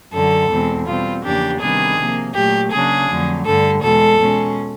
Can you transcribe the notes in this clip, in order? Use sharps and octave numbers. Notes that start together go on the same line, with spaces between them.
F#2 D3 F#3 A4
E2 B2 G#3 C4
B2 G3 C4 F4
E2 C#3 F3 A#3 D4 G4
C3 D#3 G3 B3 D4 G#4
C3 F3 A#3
A#2 F#3 A3 G4
C#3 F#3 A#3 D4 G#4
F2 D3 F#3 A3
G2 D3 G3 A4
E2 B2 G#3 A4
B2 G#3 C#4